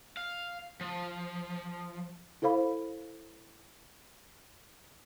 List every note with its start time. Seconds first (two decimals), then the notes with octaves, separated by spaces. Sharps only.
0.17 F5
0.81 F3
2.42 E4 A4 C5 F5 B5